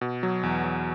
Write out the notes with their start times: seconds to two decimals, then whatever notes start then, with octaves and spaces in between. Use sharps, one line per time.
0.01 B2
0.23 F#3
0.43 E2
0.64 F#3